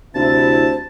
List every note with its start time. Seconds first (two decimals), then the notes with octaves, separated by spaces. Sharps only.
0.15 D2 C3 E4 C5 A5